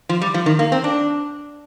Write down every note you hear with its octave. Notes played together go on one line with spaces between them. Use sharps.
F3
G3
F3
D#3
A#3
C4
D4